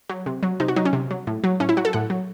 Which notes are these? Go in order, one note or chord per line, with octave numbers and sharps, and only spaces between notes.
F#3
C3
F#3
C3 D#4
F#4
F#3 D#4
C#4
C3
F#3
A2
F#3
A2 C#4
E4
F#3 F#4
A4
A2 F#5
F#3